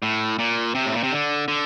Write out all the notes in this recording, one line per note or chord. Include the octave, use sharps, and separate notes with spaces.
A2
A#2
C3
A2
A#2
C3
D3
D3